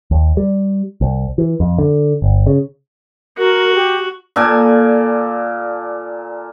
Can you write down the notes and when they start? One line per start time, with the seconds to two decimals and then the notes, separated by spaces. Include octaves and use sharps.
0.11 D#2
0.37 G3
1.01 C2
1.38 E3
1.60 F2
1.78 D3
2.22 G1
2.47 C#3
3.38 F#4 A#4
3.75 G4
4.36 A#2 A4 D5 G#5